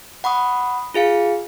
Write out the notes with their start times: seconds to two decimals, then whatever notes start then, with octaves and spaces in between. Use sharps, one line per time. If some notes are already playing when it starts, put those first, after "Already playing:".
0.24 F#5 B5 C#6 D#6
0.94 F4 G#4 F5 C#7